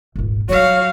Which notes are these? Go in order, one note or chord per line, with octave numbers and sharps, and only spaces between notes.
D#1 G#1
F#3 G3 F#4 C#5 F5